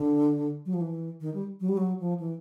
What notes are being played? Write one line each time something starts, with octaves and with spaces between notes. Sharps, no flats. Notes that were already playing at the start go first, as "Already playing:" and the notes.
Already playing: D3
F#3
F3
E3
D#3
G3
F#3
G3
F#3
F3
E3